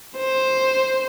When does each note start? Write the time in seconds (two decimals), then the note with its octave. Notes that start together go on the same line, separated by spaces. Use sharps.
0.18 C5